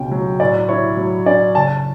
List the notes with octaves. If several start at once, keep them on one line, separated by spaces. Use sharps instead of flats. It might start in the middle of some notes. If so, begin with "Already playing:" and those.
Already playing: C#2 B2 C#4 G5
F#3
A2 D5
E4 C#5
F#3
C#4 D5
F#1 A5